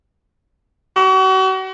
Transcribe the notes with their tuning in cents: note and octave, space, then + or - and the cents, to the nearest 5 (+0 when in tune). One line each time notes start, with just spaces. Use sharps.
F#4 +40